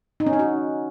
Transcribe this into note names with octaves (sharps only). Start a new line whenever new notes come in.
D#4
C#4
D#4
F#4